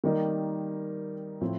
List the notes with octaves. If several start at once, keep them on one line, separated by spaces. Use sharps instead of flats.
D#3 G3 A#3 D#4
A2 F3 A3 C4 E4